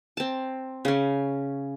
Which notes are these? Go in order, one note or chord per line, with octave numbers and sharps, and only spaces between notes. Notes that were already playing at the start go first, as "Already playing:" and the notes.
C4 A5
C#3 C#4